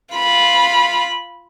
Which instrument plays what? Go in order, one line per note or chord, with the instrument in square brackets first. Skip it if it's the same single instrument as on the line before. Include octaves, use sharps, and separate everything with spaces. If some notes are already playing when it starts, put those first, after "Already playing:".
[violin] F4 B5